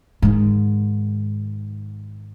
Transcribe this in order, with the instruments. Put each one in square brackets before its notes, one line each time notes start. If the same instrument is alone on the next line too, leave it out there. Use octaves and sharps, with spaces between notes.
[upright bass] G#2 D#3